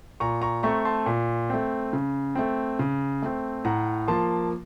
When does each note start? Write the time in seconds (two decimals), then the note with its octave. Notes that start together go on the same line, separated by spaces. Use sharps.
0.20 A#2 A#5 C#6
0.42 A#5 C#6
0.63 A3 C4 A#5 C#6
0.85 A5 C6
1.06 A#2
1.50 A3 C4
1.93 C#3
2.35 A3 C4
2.79 C#3
3.22 A3 C4
3.65 A2 F#5 A#5
4.08 F3 A#3 A5 C6